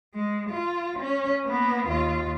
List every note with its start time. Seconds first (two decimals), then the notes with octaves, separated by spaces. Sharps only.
0.14 G#3
0.50 F4
1.00 C#4
1.45 A#3 B3
1.88 D#2 F4